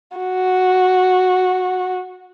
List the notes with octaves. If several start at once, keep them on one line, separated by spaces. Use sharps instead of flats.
F#4